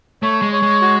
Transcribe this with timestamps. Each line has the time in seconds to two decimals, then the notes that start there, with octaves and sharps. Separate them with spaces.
0.22 A3 C#5
0.42 G#3
0.53 C#5
0.62 G#3
0.81 F#4